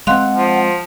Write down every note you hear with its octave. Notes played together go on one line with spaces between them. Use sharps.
G#3 C4 F5 F#5 C6 F#6
F3